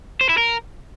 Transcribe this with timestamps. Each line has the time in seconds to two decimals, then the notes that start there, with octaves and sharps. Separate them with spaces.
0.21 C5
0.29 E4
0.38 A#4